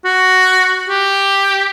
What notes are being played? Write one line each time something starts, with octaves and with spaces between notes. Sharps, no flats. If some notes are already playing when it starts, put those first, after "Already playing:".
F#4
G4